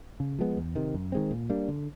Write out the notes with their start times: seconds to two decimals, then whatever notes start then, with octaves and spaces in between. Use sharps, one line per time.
0.20 C#3
0.39 F3 G#3 B3
0.57 E2
0.76 C3 D#3
0.94 F#2
1.12 D#3 G#3 C4
1.31 A#2
1.50 G3 A#3 D4
1.68 D3